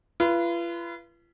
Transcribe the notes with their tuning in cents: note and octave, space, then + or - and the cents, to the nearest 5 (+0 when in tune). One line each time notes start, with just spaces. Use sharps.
F4 -40 B4 -15